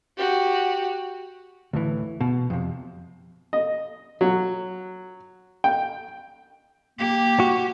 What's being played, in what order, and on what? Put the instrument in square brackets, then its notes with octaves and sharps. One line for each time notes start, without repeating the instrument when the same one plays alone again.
[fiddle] F#4 G4
[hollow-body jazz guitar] D2 A2 E3
B2
F2 C3
[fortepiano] D#5
F#3
G5
[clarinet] A#3 [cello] G4
[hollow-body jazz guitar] F#4